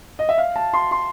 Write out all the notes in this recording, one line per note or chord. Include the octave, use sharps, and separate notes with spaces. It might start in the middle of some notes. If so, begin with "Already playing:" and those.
D#5
E5
F5
A5
C6
C6